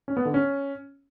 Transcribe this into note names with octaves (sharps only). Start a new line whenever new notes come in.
C#4
B3
D3
C#4